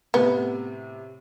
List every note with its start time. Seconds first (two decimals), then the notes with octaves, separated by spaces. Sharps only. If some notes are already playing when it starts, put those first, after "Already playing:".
0.14 A2 C3 B3